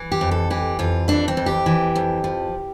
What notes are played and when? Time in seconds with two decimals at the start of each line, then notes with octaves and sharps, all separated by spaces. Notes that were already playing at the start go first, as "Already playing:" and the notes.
Already playing: E3
0.12 G4
0.21 F2
0.31 A4
0.50 E3 G4
0.79 F2 F4
1.08 E3 D4
1.28 C4
1.37 F2
1.46 G4
1.66 E3
1.96 F2
2.24 F3